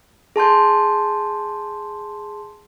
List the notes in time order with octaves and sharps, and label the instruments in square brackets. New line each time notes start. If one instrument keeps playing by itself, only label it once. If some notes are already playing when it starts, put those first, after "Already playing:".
[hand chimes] G#4 A5 C6 G6